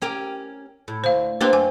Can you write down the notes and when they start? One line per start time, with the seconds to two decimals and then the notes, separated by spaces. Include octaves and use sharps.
0.02 C#4 G4 A#4
0.88 A2
1.04 D2 C5 F5
1.41 A#3 C4 D4 G4 B4 C5
1.53 F#2 G#5 D6